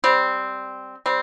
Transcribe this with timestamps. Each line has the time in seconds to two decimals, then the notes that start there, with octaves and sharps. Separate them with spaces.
0.04 G3 C4
1.06 G3 C4